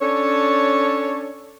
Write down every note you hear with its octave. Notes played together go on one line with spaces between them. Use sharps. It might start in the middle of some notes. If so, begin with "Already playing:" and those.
C#4 D4 A4 C#5